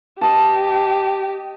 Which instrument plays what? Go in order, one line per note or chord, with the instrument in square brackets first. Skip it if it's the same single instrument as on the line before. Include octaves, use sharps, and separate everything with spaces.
[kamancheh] G4 [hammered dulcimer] D#5 A5